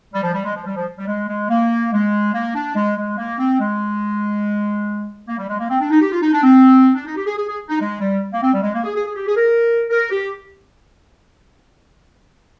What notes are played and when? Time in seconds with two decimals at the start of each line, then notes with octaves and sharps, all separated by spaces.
0.13 G3
0.23 F3
0.34 G3
0.44 G#3
0.55 F3
0.65 G3
0.76 F3
0.97 G3
1.07 G#3
1.28 G#3
1.49 A#3
1.92 G#3
2.33 A#3
2.55 D4
2.75 G#3
2.97 G#3
3.17 A#3
3.39 C4
3.60 G#3
5.28 A#3
5.38 G3
5.48 G#3
5.59 A#3
5.70 C4
5.80 D4
5.91 D#4
6.01 G4
6.11 F4
6.22 D#4
6.33 D4
6.43 C4
6.95 D4
7.06 D#4
7.16 G4
7.26 G#4
7.38 G#4
7.48 G#4
7.69 D#4
7.79 G#3
8.00 G3
8.32 A#3
8.42 C4
8.53 G3
8.63 G#3
8.74 A#3
8.84 G#4
8.95 G#4
9.05 G#4
9.16 G4
9.27 G#4
9.36 A#4
9.90 A#4
10.11 G4